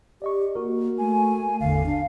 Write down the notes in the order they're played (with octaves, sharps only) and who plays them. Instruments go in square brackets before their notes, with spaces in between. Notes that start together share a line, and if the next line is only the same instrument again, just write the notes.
[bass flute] G4 [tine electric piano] D5 D#5 C#6
[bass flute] A#3 [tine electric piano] F#4 A#4
[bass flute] A3 [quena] G#5
[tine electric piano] G#1 E2 [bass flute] D3 [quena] F5
[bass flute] D4